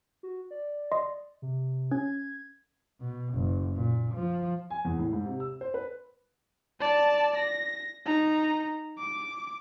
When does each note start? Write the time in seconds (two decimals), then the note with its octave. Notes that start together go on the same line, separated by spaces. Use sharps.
0.23 F#4
0.51 D5
0.92 D#5 C6
1.42 C3
1.91 C#4 G#6
3.01 B2
3.35 F#1
3.75 A#2
4.13 F3
4.70 G#5
4.85 E2
4.99 A2
5.13 G#2
5.26 C3
5.40 E6
5.61 C5
5.74 B4
6.81 D5 A5
7.37 A#6
8.06 D#4 A#5
8.99 D6